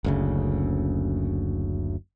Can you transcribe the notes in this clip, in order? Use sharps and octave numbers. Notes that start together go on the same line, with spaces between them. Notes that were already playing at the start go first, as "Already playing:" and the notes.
F#1 D2 C#3